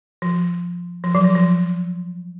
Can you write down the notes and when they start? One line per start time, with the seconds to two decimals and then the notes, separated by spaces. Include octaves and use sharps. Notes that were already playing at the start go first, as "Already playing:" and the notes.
0.22 F3
1.04 F3
1.15 F#3
1.24 F3
1.35 F3